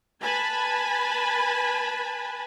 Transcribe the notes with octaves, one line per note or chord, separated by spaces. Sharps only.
B4 G#5 A5 B5